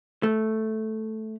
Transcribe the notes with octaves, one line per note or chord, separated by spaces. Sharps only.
A3